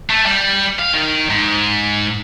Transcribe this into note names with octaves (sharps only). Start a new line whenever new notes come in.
A3
G3
F5
D#3
G#2